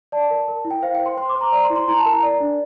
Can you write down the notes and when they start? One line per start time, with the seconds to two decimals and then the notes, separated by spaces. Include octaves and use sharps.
0.12 D5 A5
0.31 A#4
0.48 A#4
0.65 E4
0.71 G5
0.83 C5 F5
0.95 G5
1.00 C5
1.06 C6
1.17 C5 C6
1.29 D6
1.35 C5
1.41 A#5
1.53 D5 A#5
1.64 C6
1.70 E4
1.76 C6
1.88 E4 A#5
1.99 A5
2.06 A#4
2.11 A#5
2.23 D5
2.40 D4